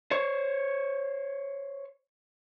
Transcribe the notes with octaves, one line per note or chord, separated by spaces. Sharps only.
C5 C#5